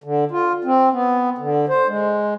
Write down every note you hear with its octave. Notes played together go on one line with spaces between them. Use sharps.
D3
F4
C4
B3
D3
C5
G#3